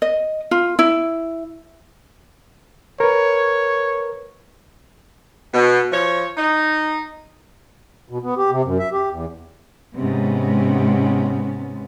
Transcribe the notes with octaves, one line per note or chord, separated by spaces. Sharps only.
D#5
F4
E4
A#4 B4 C#5
B2
F3 C#5
D#4
B2
B3
G4
C3
F#2
E5
G4
E2
G#2 C3 B3 C#4